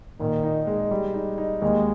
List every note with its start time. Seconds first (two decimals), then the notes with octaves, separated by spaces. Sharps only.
0.20 A#2 D#3
0.43 D#4
0.67 G#3
0.91 G3
1.14 D#4
1.38 D#4
1.62 D#2 G#3